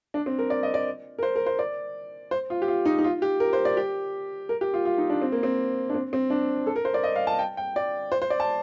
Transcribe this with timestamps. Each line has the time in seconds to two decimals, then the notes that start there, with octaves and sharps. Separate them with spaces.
0.14 D4
0.26 C4
0.39 A#4
0.50 D5
0.63 D#5
0.74 D5
1.19 A#4
1.23 C5
1.36 A#4
1.46 C5
1.59 D5
2.31 C5
2.50 F4
2.62 G4
2.68 F4
2.85 D#4
2.99 D#4
3.04 F4
3.22 G4
3.40 A#4
3.53 C5
3.65 D5
3.77 G4
4.49 A#4
4.61 G4
4.74 F4
4.85 F4
4.98 D#4
5.10 D4
5.22 C4
5.32 A#3
5.43 C4
5.90 D4
5.95 C4
6.13 C4
6.30 D4
6.67 A4
6.76 A#4
6.85 C5
6.94 D5
7.04 D#5
7.16 F5
7.27 A5
7.39 G5
7.57 G5
7.76 D5
8.12 C5
8.22 C5
8.30 D5
8.40 A5